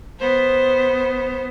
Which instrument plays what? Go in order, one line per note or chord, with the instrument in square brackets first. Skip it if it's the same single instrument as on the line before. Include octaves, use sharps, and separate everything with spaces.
[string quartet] B3 C5